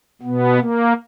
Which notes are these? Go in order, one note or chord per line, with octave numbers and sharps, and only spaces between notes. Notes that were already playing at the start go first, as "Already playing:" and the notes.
B2 B3
A#3